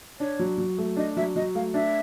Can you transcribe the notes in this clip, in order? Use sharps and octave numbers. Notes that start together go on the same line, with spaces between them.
D4 C#5
F#3
F#3
A3
D4 D#5
F#3 E5
F#3 D#5
A3 F5
D4 E5